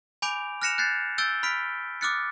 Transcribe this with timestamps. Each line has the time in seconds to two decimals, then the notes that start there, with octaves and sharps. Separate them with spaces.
0.22 G#5 B5 D6 G6 D7 F7
0.62 F6 F#6 A#6 C#7 E7 F7
0.78 F#6 G6 A6 C7
1.18 E6 G6 A6 D7 G7
1.43 B5 F6 B6 D7
2.01 D6 D#6 F6 F#6 A6 C#7